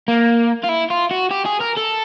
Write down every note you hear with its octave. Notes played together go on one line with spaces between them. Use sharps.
A#3
F4
E4
F4
F#4
G4
G#4
A#4
A4